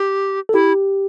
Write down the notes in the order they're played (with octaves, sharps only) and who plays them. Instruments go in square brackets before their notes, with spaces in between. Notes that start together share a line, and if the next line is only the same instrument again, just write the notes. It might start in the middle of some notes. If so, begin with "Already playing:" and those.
Already playing: [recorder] G4
[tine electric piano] A4
[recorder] E4 [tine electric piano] G4